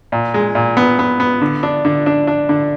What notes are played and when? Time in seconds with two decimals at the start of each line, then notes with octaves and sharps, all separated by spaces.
0.12 A#2
0.34 G#3
0.55 A#2
0.77 B3
0.99 B3
1.20 B3
1.41 D3
1.63 D4
1.85 D3
2.06 D4
2.27 D4
2.49 D3